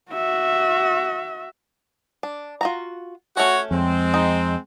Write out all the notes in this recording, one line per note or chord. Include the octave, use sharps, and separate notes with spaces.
F#4 E5
D4
F4 F#4 A#5
A3 C#4 F#4 C#5
F2 G#3 C4
D#4